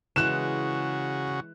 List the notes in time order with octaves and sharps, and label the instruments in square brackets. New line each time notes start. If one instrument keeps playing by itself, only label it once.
[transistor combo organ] C#3 F#4 [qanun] E3 G#3 [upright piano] F#6 E7